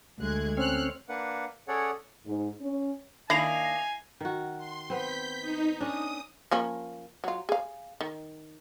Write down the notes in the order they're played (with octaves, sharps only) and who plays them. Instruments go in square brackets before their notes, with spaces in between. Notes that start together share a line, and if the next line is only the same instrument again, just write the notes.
[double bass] D2 [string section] G#3 F#6 G#6
[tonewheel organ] C4 C#4 [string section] F6 F#6
[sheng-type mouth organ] A#3 D4 B4 F#5
C#4 G#4 A4 C#5 D5 F#5
[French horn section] G#2
C#4
[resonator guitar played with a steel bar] D#3 A#3 D4 [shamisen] E4 [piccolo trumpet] G#5 [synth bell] A#6 C7 F7
[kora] D#3 F#4
[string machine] C6
[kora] B3 C4 [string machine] G6 B6
[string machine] D#4
[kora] C#4 D4 [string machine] D#6
[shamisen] F3 A#3 C#4
F#3 F4
G#4 F5
D#3